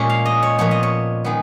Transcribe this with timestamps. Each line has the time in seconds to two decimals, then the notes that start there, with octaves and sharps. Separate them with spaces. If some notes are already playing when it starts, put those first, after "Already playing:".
Already playing: A#2 G#3 C#4
0.09 F5
0.26 D#5
0.43 C#5
0.58 A#2 F3 B3 C#5
0.71 D#5
0.83 C#5
1.25 D#3 G#3 B3